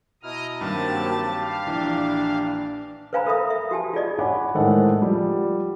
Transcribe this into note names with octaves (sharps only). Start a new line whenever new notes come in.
B2 E4 D#5 A#5 D#6 F6
G2 D#3 F#3 A#3 C4 G4 A5
F5
A#1 E3 D4
B4 C5 F5 G#5 A#5 B5
A4 A#4 E5 B5 D#6
E5
F#4 G4 G#5 A5
F4 G#4 D5 D#5
C#5 F#5 G#5 B5 D6
A2 D#3 G#3 A4 C5 F#5
F3 G3